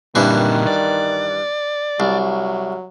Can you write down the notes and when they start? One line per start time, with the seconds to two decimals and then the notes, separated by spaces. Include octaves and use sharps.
0.15 G2 A#2 D#3 E3 C4
0.67 D5
2.00 C2 F#3